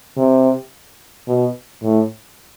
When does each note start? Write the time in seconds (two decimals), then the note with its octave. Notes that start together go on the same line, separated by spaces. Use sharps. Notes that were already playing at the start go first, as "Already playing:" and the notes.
0.17 C3
1.28 B2
1.83 A2